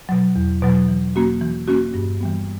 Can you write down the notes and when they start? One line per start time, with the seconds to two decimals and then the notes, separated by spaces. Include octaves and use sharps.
0.09 B2 F#3
0.36 E2
0.62 B2 F#3
0.88 E3
1.15 A#3 C#4 F#4
1.41 E3
1.68 A#3 C#4 F#4
1.94 G2
2.21 E3 G3 B3